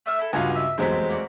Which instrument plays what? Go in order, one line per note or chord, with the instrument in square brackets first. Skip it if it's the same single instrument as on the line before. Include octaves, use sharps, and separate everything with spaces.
[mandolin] A3 E5 F6
E4 A4
[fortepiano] C#2 F5 [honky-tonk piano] G2 F4 F#4 [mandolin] G#4 F#5 C6
[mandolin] D#5 E5
[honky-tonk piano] F1 E2 B6 [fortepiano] F#3 G#3 C4 [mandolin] C5
[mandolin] A#3 F#4 D5